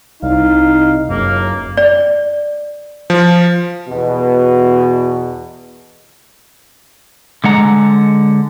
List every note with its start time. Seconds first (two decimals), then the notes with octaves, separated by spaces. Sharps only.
0.23 C2 D#4 F5
1.09 F#1 C#2 A2 A#3
1.77 D5
3.10 F3
3.89 E2 B2
7.44 D3 G#3 F#5 A#5